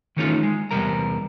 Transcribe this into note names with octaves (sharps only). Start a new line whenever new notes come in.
D#3 E3 A3 C#4 D#4 F4
G#3
E2 G2 C3 G3 A#4 A#5